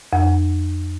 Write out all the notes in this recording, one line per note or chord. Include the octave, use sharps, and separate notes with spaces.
F2